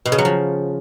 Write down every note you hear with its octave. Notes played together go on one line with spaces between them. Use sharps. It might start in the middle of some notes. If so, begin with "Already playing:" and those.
B2
C#3
F#3
F3